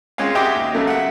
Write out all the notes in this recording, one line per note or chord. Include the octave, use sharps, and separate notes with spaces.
G#3 C4 C#4 F4 F5
F#4 G4 D#5 E5 G5 D6
D#2
C#3 F#3 A3
E5 F#5